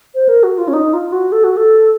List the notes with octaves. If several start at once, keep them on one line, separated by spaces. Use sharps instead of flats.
C5
A#4
F#4
F4
C#4
D#4
F4
F#4
A4
F#4
A4